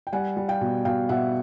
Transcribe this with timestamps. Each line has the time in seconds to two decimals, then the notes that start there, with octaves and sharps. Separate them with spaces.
0.07 G5
0.13 G3 F#5 G#5
0.37 G3
0.48 F5 G5
0.61 B2
0.85 B2 F5 G5
1.09 B2 E5 F#5